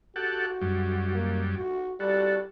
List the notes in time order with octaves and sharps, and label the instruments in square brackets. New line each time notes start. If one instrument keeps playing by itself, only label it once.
[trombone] F#4 [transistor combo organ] G4 A4 F#5
[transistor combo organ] F#2 G3
[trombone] A#3
F#4
[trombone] G3 [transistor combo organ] F#4 A4